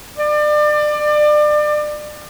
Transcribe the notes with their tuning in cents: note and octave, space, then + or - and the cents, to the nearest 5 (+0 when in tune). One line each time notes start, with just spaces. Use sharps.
D5 +30